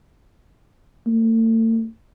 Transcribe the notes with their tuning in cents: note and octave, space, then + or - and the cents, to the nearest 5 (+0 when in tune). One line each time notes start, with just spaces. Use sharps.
A3 +45